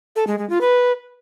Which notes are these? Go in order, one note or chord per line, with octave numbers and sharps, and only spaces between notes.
A4
G#3
G#3
F4
B4